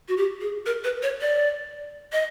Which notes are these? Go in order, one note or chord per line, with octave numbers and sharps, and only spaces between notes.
F#4
G4
G#4
A#4
B4
C#5
D5
D#5